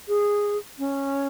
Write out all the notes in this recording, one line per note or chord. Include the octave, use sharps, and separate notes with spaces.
G#4
C#4